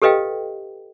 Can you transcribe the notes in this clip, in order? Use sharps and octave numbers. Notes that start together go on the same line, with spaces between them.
G4 A4 B4 D#5 F5 G5